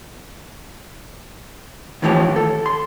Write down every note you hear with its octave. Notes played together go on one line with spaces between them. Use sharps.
D#2 A2 E3 F3 G4 C#5
A4
C6